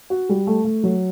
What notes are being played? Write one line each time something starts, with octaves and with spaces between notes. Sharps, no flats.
F#4
G3
A3
A3
F#3